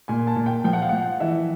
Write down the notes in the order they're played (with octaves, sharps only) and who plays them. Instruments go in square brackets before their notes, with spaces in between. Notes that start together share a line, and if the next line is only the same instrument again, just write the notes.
[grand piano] A#2 G#5
A5
A#2
G5
F3 G5
F#5
F5
F3 F#5
E3 E5